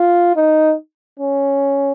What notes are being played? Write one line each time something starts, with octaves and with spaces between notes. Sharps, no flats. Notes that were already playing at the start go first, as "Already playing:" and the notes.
Already playing: F4
D#4
C#4